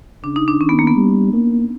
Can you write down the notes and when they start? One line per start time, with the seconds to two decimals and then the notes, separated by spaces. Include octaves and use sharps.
0.24 C#3 D4
0.36 D#4
0.48 D4
0.60 D#3 C#4
0.69 B3
0.79 A#3
0.87 B3
0.96 G3
1.33 A#3